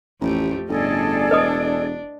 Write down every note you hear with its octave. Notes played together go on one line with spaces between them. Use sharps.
A1 F2 A3 G4
G1 A2 C#4 G#4 A4 D5 D#5
E1 D4 B4 D#5 D#6